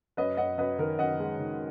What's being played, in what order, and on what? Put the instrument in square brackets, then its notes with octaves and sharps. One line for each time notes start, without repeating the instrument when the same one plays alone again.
[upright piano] F#2 B4 D#5
F#2 D#5 F#5
F#2 B4 D#5
D#3 A#4
F#2 D#5 F#5
G#3
D#3